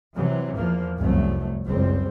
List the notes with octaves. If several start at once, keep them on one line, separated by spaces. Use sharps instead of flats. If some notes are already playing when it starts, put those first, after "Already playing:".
C3 E3 F#3
E2 F3 A#3
F1 C2 F#2 F#3 A3
F#1 C#2 G3 C4